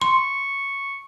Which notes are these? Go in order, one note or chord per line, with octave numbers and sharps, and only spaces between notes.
C6 C#6